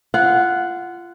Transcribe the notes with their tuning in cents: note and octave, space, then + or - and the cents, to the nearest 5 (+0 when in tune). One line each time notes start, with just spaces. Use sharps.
F4 -20 F#5 +0